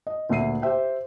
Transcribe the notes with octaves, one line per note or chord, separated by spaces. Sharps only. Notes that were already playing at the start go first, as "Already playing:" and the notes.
D#5
D2 A#2 E5 C7 D#7
G4 C5 E5 G5